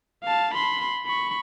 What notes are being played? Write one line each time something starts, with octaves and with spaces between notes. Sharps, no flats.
F5 A5
B5 C6
B5 C#6